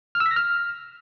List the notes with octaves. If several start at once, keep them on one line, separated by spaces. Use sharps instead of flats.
F6
E6
B6
A#6
F6